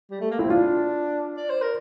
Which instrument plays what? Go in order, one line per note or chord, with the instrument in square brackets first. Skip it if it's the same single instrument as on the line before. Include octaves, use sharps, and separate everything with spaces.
[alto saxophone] G3
A3
A#3
[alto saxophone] C4 [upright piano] E4
[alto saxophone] D4 [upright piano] F4
[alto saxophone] D5
C5
A#4